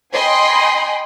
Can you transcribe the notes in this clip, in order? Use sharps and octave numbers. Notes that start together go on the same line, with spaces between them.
D#5 G5 G#5 B5 C6